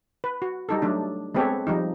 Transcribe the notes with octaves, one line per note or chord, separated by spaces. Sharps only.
B4
F#4
G3 D#4 A4
F#3 A3 D4
G#3 B3 C4 G4 A4 C#5
F3 G3 D#4